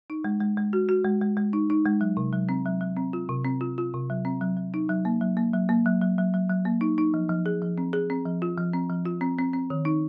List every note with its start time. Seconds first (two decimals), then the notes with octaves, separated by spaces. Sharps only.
0.10 D#4
0.24 G#3
0.41 G#3
0.57 G#3
0.73 F#4
0.89 F#4
1.05 G#3
1.21 G#3
1.37 G#3
1.53 D#4
1.70 D#4
1.85 G#3
2.01 F#3
2.17 C3
2.33 F#3
2.49 C4
2.66 F#3
2.81 F#3
2.97 C4
3.13 F4
3.29 C3
3.45 C4
3.61 F4
3.78 F4
3.94 C3
4.10 F#3
4.25 C4
4.41 F#3
4.57 F#3
4.74 D#4
4.89 F#3
5.05 A#3
5.21 F#3
5.37 A#3
5.54 F#3
5.69 A#3
5.86 F#3
6.02 F#3
6.18 F#3
6.34 F#3
6.50 F#3
6.65 A#3
6.81 D#4
6.98 D#4
7.14 F3
7.29 F3
7.46 G#4
7.62 F3
7.78 C4
7.93 G#4
8.10 C4
8.26 F3
8.42 F4
8.58 F3
8.73 C4
8.90 F3
9.06 F4
9.21 C4
9.38 C4
9.54 C4
9.70 D#3
9.85 D#4